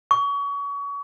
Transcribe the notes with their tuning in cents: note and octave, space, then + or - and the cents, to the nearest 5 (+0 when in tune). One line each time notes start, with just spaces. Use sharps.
C#6 +30